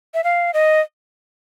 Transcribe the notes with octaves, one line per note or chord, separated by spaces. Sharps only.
E5
F5
D#5